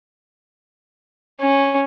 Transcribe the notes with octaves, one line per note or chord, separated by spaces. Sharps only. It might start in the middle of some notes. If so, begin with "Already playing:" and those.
C#4